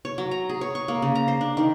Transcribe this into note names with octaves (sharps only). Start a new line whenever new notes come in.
C#5
F#3
A#5
G#4
C#5
C#6
A#3
C#3
A#5
C5
D4
D#3